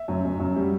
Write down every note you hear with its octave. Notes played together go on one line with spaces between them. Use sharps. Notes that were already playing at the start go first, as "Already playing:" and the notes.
Already playing: E5
F#2
F#2
F#2
G3